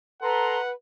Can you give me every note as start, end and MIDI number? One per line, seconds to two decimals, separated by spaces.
0.22 0.60 69
0.22 0.72 71
0.22 0.72 78
0.22 0.59 82
0.22 0.59 84